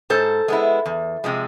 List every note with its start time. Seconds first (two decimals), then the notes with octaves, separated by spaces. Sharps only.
0.10 G#2 A4 C5
0.48 G#3 B3 E4
0.86 E2
1.24 C3 F3 G#3